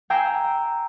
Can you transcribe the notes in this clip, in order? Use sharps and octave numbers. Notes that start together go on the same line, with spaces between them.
G5 G#5 A#5 E6 C7 D7